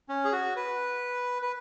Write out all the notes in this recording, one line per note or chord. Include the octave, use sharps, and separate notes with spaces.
C#4
G#4
F#4
B4
B4